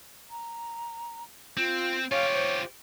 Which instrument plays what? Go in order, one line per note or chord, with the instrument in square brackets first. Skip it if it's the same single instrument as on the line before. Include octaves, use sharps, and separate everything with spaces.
[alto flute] A#5
[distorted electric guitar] C4 [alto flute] F4
[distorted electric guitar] F4 G4 [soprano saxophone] C#5 [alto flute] F5
[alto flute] C5